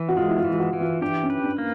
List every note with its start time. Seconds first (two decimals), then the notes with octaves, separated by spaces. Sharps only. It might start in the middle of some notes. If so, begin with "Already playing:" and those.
Already playing: E3
0.09 F#4
0.16 G#3 F4
0.29 E4
0.38 F4
0.45 E3
0.51 F4
0.59 F#4
0.73 E3
0.80 F4
1.02 D4 G4
1.23 C#4
1.30 B4
1.44 D4
1.58 A#3